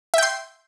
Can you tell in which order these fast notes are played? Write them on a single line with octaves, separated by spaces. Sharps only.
E5 G5 C6